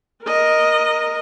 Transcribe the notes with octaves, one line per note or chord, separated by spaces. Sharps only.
A#4 D#5